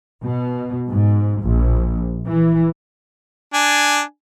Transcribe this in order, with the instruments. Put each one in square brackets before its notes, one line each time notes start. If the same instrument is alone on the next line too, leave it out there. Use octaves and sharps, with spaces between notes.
[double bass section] B2
G#2
A#1
E3
[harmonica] D4 G#5